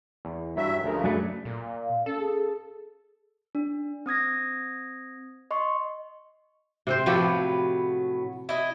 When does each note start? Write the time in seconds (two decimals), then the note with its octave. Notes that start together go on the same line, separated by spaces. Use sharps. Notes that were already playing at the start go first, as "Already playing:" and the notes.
0.25 E2
0.57 G2 F#3 E5
0.84 D2 C#3 F3 A#4
1.04 F#2 F#3 A3 D4 B4
1.45 A#2
1.83 F5
2.06 C#4 A4
2.19 G#4
3.55 D4
4.06 C4 D#6 G#6 A#6
5.51 D#5 C6 C#6
6.87 C3 C4 C5
7.06 A2 F3 F#3 B3 G4 A4
8.49 E4 D#5